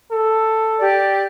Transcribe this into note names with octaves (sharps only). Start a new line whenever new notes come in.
A4
G4 D5